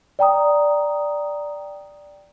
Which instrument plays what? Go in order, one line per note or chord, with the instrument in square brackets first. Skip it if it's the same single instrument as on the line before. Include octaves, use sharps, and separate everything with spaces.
[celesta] D5 G5 A#5 D#6